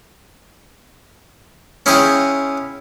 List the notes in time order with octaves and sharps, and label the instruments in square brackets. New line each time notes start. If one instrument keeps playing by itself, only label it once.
[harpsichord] C#4 E4 F4 G#4 D#5 G5